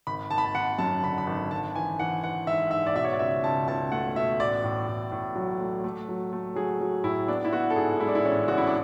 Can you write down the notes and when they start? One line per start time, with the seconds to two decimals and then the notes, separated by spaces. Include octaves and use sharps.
0.07 G#1 B5
0.31 G#1 A5
0.38 B5
0.45 A5
0.55 G#1 F#5
0.78 F#2 A5
1.03 D3 B5
1.18 B5
1.27 G#1 A5
1.51 G#1 A5
1.75 E3 G#5
1.99 E3 F#5
2.24 E3 F#5
2.47 G#2 E5
2.71 G#2 E5
2.86 D5
2.95 B2 E5
3.05 C#5
3.13 D5
3.19 C#2 E5
3.44 C#2 A5
3.67 C#2 A5
3.92 A3 F#5
4.15 B2 E5
4.40 A1 D5
4.64 A2
4.87 A2
5.12 A2
5.36 F#3
5.60 A3
5.84 A3
6.09 F#3
6.33 A3
6.56 F#3 G#4
6.81 F#3
7.04 A2 E4
7.28 B3 D4
7.45 E4
7.52 B3 F#4
7.70 A4
7.76 G#2 G#4
8.00 G#3 E4
8.08 D4
8.15 E4
8.25 A1 C#4
8.48 A1 F#4
8.58 E4
8.67 D4